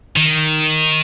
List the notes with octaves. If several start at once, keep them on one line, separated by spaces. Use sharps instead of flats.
D#3